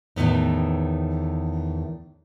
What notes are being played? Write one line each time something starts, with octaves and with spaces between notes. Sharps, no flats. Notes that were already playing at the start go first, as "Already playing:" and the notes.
E2 A2 D#3 B3 D#4